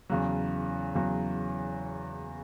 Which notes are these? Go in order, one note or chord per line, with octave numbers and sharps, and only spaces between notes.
E2 C#3 F#3
E2 C#3 F#3